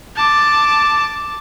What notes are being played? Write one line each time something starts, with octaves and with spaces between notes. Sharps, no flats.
A5 D6